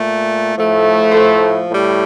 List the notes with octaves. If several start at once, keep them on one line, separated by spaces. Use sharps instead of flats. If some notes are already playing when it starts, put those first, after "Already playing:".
Already playing: A#2 A3
A2 F3 A3
A4 C5
A2 G3